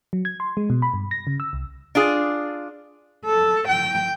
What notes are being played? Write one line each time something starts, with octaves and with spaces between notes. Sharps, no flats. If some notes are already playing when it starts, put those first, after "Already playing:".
F#3
G#6
C6
G#3
B2
B5
G2
A#6
C#3
E6
C2
D4 F4 G#4
A4
G5